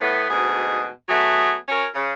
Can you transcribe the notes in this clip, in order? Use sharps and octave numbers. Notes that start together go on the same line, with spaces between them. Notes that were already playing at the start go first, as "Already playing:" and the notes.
A2 B3
D2 G#2 B2 G#4
F#3 A3 B3 G#4
C#4 F#4 A#4 C#5
C#3